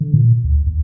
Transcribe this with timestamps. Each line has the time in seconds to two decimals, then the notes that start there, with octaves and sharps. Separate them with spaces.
0.01 D3
0.14 A#2
0.44 D2
0.67 D#2